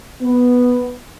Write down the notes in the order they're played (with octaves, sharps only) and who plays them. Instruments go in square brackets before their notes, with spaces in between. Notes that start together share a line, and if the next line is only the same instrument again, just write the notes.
[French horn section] B3